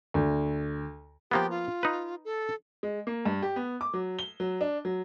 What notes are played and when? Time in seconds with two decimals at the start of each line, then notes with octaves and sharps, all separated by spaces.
0.14 D2
1.31 F3 A#3 B3 G4
1.50 F4
1.83 D#4 B4
2.25 A4
2.83 G#3
3.07 A#3
3.26 G2
3.42 G4
3.56 B3
3.81 D6
3.94 F#3
4.19 G7
4.40 F#3
4.61 D4
4.85 F#3